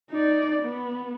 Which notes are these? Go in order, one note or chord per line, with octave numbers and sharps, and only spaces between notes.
D#4 D5
B3